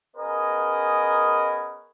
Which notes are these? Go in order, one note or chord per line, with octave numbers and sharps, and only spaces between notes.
B3 C#4 G#4 A#4 B4 D#5